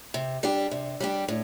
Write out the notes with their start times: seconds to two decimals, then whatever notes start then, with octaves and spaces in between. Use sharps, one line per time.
0.14 C3
0.43 G3 D4 G4
0.71 C3
1.00 G3 D4 G4
1.28 A2